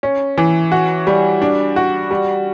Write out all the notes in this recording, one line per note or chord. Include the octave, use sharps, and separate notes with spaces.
C#4
E3
F#4
G3
D4
F#4
G3